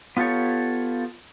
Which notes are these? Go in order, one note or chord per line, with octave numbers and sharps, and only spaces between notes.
B3 F4 G4 A4 C#5